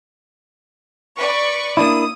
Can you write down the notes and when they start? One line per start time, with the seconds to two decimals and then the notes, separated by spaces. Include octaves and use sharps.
1.18 B4 D5 C#6
1.77 A#3 D4 E4 D#6